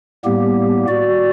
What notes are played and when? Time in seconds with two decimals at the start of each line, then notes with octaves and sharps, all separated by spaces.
0.25 A2 G3 A#3 B3 G4
0.88 F#4 D5